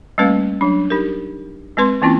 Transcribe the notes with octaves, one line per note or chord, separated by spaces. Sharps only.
G3 A3 A#3 C#4 B4 F5
F#3 D4
D#4 G4 A#4
G#3 C4 B4 C6
E3 A#3 C4 C#4 E4 F4